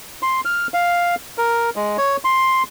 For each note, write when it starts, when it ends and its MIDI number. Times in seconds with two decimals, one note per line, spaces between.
0.22 0.41 84
0.45 0.67 89
0.74 1.15 77
1.38 1.70 70
1.76 1.97 56
1.98 2.17 73
2.24 2.63 84